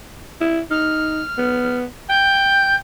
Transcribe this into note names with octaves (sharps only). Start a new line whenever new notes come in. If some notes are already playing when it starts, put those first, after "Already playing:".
E4
D#4 F6
B3
G5 G6